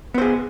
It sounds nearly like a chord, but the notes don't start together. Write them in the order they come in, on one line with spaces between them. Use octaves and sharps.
B3 C5 G#4